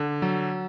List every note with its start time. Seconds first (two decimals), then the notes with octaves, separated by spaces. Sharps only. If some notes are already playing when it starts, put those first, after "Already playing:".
Already playing: D3
0.22 F#3